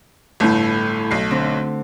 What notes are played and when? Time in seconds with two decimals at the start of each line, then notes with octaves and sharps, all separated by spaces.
0.40 G1 A2 A3
1.11 B1 C7
1.31 D3 C4